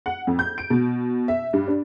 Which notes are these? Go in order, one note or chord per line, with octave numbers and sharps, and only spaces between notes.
F#5
F2
G6
D7
B2
E5
G2
D4